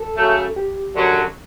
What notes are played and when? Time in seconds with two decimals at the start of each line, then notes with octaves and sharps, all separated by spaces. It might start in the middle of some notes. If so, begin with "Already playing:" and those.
Already playing: A4
0.16 C#3 F#3 A3
0.56 G4
0.94 F#2 D3 F#3